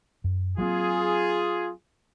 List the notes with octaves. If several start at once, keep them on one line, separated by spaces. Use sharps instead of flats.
F#2
F#3 A#3 C4 F4 G#4